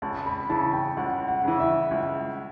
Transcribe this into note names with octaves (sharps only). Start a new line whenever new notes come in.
C#2 A5
B5
C#3 E3 A5
G5
C#2 F#5
F#5
C#3 E3
E5
C#2